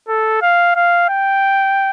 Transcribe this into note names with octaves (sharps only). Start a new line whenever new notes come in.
A4
F5
F5
G5